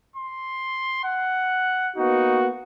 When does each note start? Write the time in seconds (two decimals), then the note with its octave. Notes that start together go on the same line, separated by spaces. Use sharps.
0.16 C6
1.04 F#5
1.97 A#3 B3 D#4 F#4